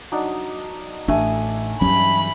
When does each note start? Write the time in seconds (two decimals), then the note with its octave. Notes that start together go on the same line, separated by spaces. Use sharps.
0.12 F#3 D4 D#4
1.08 A1 A3 D4 G#5
1.81 G2 E3 F#3 C#4 B5